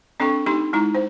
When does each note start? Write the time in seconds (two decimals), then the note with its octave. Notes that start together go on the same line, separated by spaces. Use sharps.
0.20 C4 D4 A4 G5 C#6
0.46 A3 D#4 G4 B5 C6
0.73 G#3 D#4 E4 A#5
0.95 C5